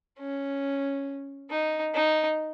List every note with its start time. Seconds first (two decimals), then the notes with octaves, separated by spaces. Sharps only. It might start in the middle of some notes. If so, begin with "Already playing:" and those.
0.19 C#4
1.50 D#4
1.94 D#4